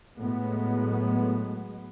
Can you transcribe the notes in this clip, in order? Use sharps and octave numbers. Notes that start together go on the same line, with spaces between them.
A2 F#3 G#3 B3